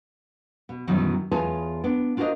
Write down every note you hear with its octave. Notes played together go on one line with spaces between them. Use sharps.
B2
F#2 B2 D#3 E3 F#3 G3
E2 F4 G#4 B4 C#5 A5
B3 D4
D4 F4 F#4 A#4 C5 D#5